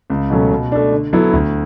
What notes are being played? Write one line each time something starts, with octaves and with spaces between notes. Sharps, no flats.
C#2
B2 F#3 A3 C#4
B2
A3 D4
D3
F#3 B3 E4 A4
D2